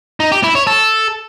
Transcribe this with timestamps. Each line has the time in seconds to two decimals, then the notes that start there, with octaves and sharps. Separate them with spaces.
0.20 D#4
0.32 G4
0.43 E4
0.55 C#5
0.67 A4